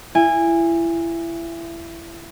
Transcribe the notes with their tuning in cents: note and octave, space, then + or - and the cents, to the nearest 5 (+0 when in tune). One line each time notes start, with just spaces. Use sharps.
E4 +25 G#5 -20